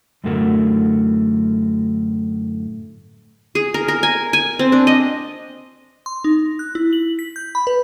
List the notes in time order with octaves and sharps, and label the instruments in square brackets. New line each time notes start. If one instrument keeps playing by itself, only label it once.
[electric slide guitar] F#2 A2 D3 A3 F#4 A#4
[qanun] G#4
A#4
A#4
G#5
G#5
C4
D4
D#5
[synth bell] C6
D#4
F#6
E4
F#7
B6
G6
B5
B4